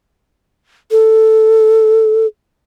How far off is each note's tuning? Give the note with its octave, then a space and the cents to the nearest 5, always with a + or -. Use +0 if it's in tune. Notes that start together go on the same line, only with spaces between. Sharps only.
A4 +0